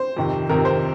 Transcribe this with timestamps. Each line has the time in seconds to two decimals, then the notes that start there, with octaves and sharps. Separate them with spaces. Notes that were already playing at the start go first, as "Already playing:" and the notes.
Already playing: C5
0.17 F2 C3 D#3
0.49 F2 C3 D#3 A#4
0.65 C5